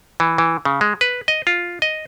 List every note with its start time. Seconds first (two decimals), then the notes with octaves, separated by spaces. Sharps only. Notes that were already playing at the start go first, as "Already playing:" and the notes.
0.20 E3
0.38 E3
0.65 C#3
0.81 G#3
1.01 B4
1.28 D#5
1.47 F4
1.82 D#5